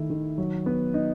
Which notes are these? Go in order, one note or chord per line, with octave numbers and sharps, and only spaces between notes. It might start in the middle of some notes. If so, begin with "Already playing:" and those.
Already playing: D#3 A3 E4
D#3
F#3
B3
D#4